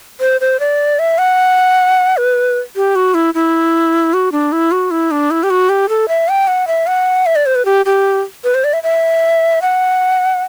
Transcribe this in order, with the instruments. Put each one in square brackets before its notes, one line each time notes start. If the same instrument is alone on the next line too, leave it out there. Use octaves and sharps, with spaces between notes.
[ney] C5
C5
D5
E5
F#5
B4
G4
F#4
E4
E4
F#4
D4
E4
F#4
E4
D4
E4
G4
F#4
G4
A4
E5
G5
F#5
E5
F#5
E5
D5
C5
B4
G4
G4
B4
C5
D5
E5
E5
F#5